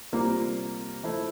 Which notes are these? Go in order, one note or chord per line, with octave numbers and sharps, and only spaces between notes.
C3 G3 A#3 F4
F3 A3 E4